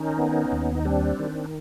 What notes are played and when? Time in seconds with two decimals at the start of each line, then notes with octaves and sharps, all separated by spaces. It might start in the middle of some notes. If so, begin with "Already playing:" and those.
Already playing: D#3 C#4 D#4
0.18 B3
0.52 D#2
0.75 D#4
0.85 G3 C4 D4
1.19 D#3